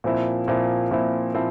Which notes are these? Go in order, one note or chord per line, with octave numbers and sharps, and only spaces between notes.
A#2 F3 C4 E4
A#2 F3 C4 E4
A#2 F3 C4 E4
A#2 F3 C4 E4